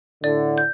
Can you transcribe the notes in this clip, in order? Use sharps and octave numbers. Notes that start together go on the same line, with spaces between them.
A2 D3 D5
G6